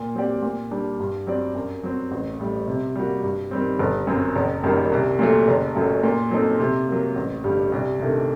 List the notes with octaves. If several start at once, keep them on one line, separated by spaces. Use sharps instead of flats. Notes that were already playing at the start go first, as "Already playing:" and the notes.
Already playing: A#2
F#3 C4 G4 D5
A#2
G3 D4
G2
F#3 C4 G4 D5
F#2
F#3 C4
A1
A2 G3
C3
G3 A#3 F#4
G2
D#3 G3 C4
G1
F#2 F#3 C4
F#1
F#2 D#3 G3 A#3
C2
A#2 F#3 A3
F#1
F#2 F#3 A3
A#2
F#3 C4 D#4 A4
C3
F#3 A#3
A1
G2 D3 G3
C2
C3 D#3 A3 D4